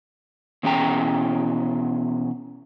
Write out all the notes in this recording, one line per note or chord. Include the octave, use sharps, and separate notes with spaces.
B2 E3 C#4 G#4 G5 A#5